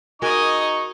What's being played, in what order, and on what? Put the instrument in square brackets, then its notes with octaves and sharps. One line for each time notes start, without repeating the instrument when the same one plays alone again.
[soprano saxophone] D#4 [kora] F#4 G#4 A#4 [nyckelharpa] D#5 G#5 [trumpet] C#6